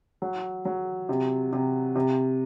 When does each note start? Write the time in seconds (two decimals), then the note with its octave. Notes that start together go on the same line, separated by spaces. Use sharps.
0.22 F#3
0.65 F#3
1.09 C3
1.53 C3
1.96 C3